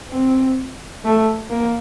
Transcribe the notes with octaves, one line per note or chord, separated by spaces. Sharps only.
C4
A3
A#3